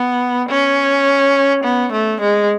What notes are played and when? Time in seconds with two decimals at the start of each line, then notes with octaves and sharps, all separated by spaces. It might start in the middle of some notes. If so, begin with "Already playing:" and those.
Already playing: B3
0.50 C#4
1.64 B3
1.93 A3
2.21 G#3